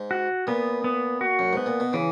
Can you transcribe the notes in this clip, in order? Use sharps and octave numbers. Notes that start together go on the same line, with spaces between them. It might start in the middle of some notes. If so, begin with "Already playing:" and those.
Already playing: G#2
F#4
A#2 B3
B3
F#4
F#2
G#2 B3
A#2
B2
C#3 E3